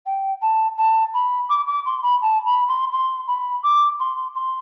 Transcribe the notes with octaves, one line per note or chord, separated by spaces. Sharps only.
G5
A5
A5
B5
D6
D6
C6
B5
A5
B5
C6
C6
B5
D6
C6
C6